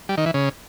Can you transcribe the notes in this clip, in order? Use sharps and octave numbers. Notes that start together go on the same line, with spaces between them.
G3
D#3
E3
C#3